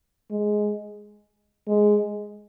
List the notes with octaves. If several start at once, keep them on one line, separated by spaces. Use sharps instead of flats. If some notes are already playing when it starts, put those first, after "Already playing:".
G#3
G#3